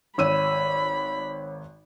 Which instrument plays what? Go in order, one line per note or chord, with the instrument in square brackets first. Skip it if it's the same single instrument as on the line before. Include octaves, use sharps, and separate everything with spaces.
[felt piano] G#1 E6 D#7 [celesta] C#5 [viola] B5